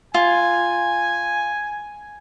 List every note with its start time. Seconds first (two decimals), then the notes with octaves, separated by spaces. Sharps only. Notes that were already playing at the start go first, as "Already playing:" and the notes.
0.14 F4 G#5